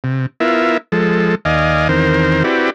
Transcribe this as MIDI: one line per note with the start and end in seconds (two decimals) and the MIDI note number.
0.04 0.26 48
0.40 0.77 59
0.40 0.77 64
0.40 0.77 65
0.40 0.77 70
0.40 0.77 76
0.92 1.35 53
0.92 1.35 56
0.92 1.35 69
1.45 1.88 39
1.45 1.88 74
1.45 1.88 75
1.45 1.88 77
1.45 1.88 80
1.89 2.43 40
1.89 2.43 51
1.89 2.43 60
1.89 2.43 70
1.89 2.43 72
2.44 2.70 60
2.44 2.70 64
2.44 2.70 66
2.44 2.70 67
2.44 2.70 71
2.44 2.70 74